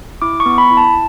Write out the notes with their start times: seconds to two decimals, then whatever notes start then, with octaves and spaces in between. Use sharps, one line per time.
0.22 E4 D6
0.40 C#6
0.46 B3
0.58 B5
0.71 E4
0.77 A5